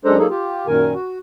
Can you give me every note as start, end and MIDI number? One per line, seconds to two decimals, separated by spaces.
0.05 0.17 42
0.05 0.17 56
0.05 0.17 62
0.05 0.17 69
0.05 0.17 72
0.05 0.17 82
0.18 0.27 54
0.18 0.27 58
0.18 0.27 63
0.18 0.27 68
0.18 0.27 69
0.30 0.67 65
0.30 0.67 67
0.67 0.94 42
0.67 0.94 46
0.67 0.94 51
0.67 0.94 70
0.67 0.94 80
0.94 1.18 66